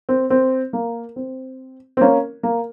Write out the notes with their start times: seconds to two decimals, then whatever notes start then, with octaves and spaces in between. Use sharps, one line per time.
0.09 C4
0.30 C4
0.73 A#3
1.16 C4
1.97 C4
2.01 A#3 C#4
2.43 A#3